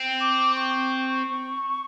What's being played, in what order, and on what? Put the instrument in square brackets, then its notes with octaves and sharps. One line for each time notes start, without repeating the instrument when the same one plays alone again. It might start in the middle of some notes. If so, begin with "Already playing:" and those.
Already playing: [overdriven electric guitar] C4
[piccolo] D6
C#6